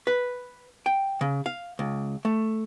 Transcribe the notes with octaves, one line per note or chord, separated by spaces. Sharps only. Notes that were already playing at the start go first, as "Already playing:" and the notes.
B4
G5
C#3
F5
C#2
A3